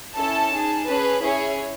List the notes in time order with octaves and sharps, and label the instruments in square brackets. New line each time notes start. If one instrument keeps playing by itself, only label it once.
[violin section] C#4 E4 A4 A5
D#4 G#4
C#4 G#4 B4
C#4 E4 G#4 C#5